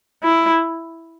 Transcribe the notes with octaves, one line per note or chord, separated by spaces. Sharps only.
E4